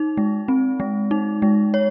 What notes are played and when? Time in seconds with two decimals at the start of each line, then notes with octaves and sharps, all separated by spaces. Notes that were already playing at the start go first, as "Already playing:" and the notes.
Already playing: D#4
0.17 G#3
0.48 C4
0.80 G#3
1.11 D#4
1.42 G#3
1.74 C#5